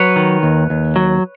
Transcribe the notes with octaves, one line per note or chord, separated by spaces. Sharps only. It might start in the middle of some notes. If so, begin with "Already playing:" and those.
Already playing: F#3 B4 C#5
D#3
D#2
D#2
F#3